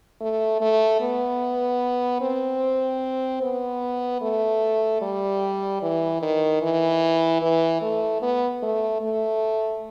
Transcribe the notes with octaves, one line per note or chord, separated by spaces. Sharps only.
A3
A3
B3
C4
B3
A3
G3
E3
D#3
E3
E3
A3
B3
A3
A3